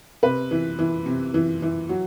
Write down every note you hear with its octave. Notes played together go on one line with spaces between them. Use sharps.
C3 B4
E3
E3
C3
E3
E3
F#3